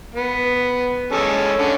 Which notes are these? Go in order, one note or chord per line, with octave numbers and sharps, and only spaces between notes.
B3
G#3 C#4 A4
D3 C#4